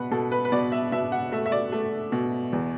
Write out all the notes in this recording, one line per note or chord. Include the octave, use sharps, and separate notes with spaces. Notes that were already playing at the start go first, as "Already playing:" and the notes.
Already playing: B2 B4 F#5
B2 A4
B4
B4
B2 D5
E5
B2 E5
F#5
A3 E5
E5
D5
A3
B2
E2